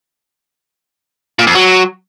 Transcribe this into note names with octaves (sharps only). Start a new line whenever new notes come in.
A#2
F2
F#3